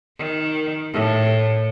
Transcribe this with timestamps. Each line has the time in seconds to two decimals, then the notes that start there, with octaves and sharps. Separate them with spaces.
0.17 D#3
0.93 A2